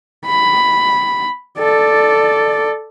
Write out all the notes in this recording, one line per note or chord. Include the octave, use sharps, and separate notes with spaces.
B5
A4 D5